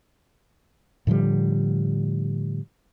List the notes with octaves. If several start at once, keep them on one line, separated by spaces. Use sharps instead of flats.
A2 D3 F3 G3